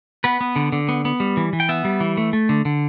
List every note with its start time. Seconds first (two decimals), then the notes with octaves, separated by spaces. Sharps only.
0.24 B3 B4
0.41 B3
0.56 D3
0.72 D3
0.89 B3
1.05 B3
1.20 G3
1.37 E3
1.53 E3
1.60 G5
1.69 B3 E5
1.85 G3
2.00 E3
2.17 A3
2.33 A3
2.49 D3
2.65 D3